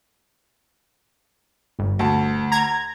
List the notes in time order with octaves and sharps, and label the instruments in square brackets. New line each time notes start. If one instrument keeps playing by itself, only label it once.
[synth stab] G1
[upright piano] D2 A5
[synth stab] A#5 G#6